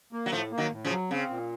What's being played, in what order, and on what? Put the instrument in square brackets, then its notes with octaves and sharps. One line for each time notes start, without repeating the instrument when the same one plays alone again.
[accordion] A#3
[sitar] F#3
[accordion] A2 [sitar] F3 A3
[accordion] A#3
[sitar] D#3 F#3
[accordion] A2
[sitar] C#3 F3
[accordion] F#3
[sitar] C#3 [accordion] C4
[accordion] A#2